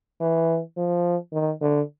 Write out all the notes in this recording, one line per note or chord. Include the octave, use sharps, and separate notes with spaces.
E3
F3
D#3
D3